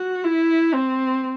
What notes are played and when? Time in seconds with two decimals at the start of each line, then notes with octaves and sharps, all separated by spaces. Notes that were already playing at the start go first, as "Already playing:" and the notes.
Already playing: F#4
0.24 E4
0.74 C4